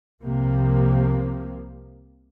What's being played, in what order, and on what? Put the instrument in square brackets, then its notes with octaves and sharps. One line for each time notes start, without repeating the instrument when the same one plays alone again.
[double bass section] C2 C3 F3 A#3